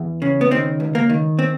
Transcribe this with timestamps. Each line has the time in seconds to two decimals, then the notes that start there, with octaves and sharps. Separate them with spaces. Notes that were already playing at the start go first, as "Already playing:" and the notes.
Already playing: E2
0.22 C#3
0.41 B3
0.51 D#3 C4
0.80 C#2
0.95 A#3
1.10 D#3
1.39 C4